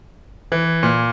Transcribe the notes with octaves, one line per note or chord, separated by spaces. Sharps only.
E3
A#2